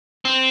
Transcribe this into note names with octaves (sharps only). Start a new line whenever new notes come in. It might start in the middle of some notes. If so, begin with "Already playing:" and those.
C4